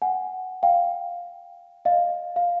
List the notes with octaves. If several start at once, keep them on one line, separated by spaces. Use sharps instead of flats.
F#5 G#5
F5 G5
D#5 F5
F5